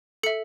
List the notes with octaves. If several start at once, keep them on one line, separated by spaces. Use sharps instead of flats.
A4 E5 C#7